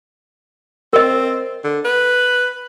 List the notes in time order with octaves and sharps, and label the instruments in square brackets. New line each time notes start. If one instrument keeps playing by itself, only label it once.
[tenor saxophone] C4 [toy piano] A#4 D#5
[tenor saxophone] D3
B4